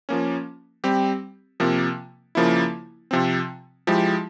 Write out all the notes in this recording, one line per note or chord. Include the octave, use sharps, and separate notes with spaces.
F3 A#3 C#4
G3 C4 G4
C3 F3 A#3
C#3 F3 A#3 E4
C3 F3 C4
F3 G#3 E4 G4